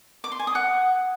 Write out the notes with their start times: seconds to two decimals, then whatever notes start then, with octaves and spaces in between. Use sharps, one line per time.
0.24 D6
0.32 C6
0.39 G#5
0.47 D#6
0.55 F#5